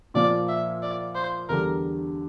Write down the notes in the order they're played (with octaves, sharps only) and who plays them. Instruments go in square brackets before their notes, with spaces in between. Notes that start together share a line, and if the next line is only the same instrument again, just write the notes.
[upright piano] A#2 F3 A#3 [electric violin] D5
[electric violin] E5
D5
C5
[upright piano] E2 D3 G3 D4 A4 [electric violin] A#4